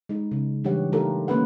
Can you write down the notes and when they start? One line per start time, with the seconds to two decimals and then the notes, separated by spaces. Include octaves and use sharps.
0.09 G#3 D#4
0.31 C#3
0.64 E3 G3 D4 G4 C#5 F#5
0.92 A3 D#4 F4 G4 A4 A#4
1.28 D3 A#3 C#4 B4 F#5